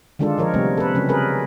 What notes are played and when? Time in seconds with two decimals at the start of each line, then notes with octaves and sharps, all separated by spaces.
0.19 D3 D#3 G#3 D4 F4 A4
0.38 D3 F3 A#4 C#5
0.53 C3 G3 A3 B3 C4
0.77 A4 B4
0.95 C#3 F#3 C#4
1.09 G#4 A#4 B4